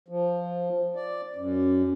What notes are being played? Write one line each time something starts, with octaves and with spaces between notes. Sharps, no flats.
F3
D5
F#2